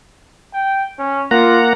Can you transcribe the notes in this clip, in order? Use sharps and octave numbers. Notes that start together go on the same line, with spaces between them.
G5
C#4
A#3 F4 F#5 A#5